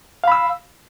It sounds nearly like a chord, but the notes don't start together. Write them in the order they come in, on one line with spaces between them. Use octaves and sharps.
F5 B5 E6